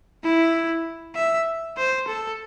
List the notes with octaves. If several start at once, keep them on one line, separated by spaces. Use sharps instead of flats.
E4
E5
C5
A4